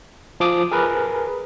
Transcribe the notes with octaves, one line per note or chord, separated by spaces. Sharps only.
F3 D6 D#6
G#4 A#4 B4